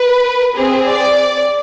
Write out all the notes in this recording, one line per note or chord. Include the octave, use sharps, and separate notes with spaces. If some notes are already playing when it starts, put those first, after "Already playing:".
Already playing: B4
C4 G#4
D5